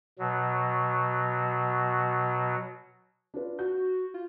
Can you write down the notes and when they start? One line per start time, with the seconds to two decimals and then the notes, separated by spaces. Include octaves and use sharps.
0.19 B2 F#3
3.34 D4 F4 B4
3.59 F#4 G6
4.14 F4